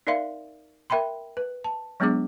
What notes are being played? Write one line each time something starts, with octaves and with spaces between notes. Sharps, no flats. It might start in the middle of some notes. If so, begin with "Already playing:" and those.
D#4 A#4 D5 E5 F5 C6
A#4 E5 G5 B5 C6
B4
A5
F#3 G#3 B3 D4 G#4 D6